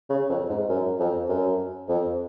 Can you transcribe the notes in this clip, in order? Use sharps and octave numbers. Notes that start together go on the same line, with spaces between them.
C#3
F2
G#2
F#2
F2
F#2
F2